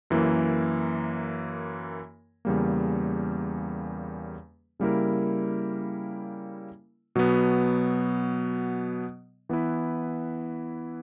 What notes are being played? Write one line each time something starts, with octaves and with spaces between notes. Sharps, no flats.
F#2 E3 A#3
E2 C#3 G3 A#3
C#3 G3 A#3 E4 A#4
B2 F#3 B3
E3 B3 E4 B4